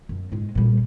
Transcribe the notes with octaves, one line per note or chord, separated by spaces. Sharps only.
F#2
G#2 G#3
A#2 G3